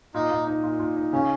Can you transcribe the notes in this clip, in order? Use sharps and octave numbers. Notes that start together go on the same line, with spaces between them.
A#2 D#4
A#2
D#4
A#2
A#2
D#4
C#3 C#4